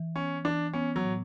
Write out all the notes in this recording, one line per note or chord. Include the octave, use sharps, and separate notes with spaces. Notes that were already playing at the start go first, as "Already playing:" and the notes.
Already playing: E3
B3 C#4
E3 D4
B3 C#4
F#3
A2